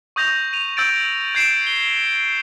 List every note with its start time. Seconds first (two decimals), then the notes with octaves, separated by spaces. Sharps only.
0.16 C#6 D#6 G6 A#6 F7
0.53 D#7 F7
0.77 E6 G6 A6 D7
1.35 G6 G#6 C7 D7 E7
1.67 G7